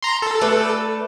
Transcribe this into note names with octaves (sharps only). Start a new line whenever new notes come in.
A#5 C6
A4
A3 D4 B4